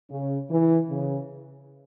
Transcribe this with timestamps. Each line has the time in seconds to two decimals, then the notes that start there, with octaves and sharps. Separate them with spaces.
0.11 C#3
0.50 E3
0.90 C#3